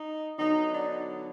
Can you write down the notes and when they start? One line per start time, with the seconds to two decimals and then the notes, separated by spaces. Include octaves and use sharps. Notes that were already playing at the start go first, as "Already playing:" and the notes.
Already playing: D#4
0.39 D3 F#3 B3 D#4
0.73 D4